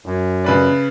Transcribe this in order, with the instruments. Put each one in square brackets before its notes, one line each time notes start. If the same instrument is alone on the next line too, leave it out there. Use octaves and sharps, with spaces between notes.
[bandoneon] F#2
[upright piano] C#3 B4 D5